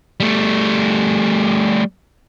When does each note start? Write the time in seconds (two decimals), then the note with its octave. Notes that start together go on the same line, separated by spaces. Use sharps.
0.20 G3 A3